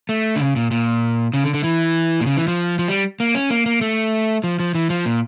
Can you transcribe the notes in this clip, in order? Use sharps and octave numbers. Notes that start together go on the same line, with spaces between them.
A3
D3
C#3
A#2
A#2
C#3
D3
D3
E3
A#2
C#3
E3
F3
F3
G3
A#3
C#4
A#3
A#3
A3
F3
F3
E3
F3
A#2